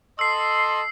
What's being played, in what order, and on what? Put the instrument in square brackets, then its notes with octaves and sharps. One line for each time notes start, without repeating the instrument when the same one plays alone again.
[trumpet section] A4 D#5 C6 [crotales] E6 C7